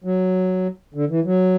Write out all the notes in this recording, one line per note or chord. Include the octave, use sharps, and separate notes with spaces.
F#3
D3
E3
F#3